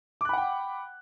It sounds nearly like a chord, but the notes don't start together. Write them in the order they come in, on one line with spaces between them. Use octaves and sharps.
D6 F#6 B5 F#5 G5